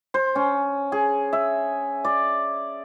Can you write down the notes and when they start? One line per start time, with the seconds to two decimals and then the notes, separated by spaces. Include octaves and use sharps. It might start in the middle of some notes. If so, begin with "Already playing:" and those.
0.14 C5
0.35 C#4
0.92 G#4
1.33 E5
2.04 D5